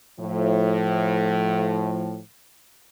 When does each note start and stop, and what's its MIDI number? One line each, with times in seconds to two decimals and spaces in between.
0.20 2.20 45
0.20 2.20 53